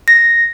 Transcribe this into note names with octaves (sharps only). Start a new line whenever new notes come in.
A#6